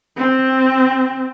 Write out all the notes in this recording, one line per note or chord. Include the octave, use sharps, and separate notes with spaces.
C4